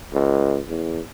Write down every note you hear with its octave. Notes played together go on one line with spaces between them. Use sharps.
C#2
E2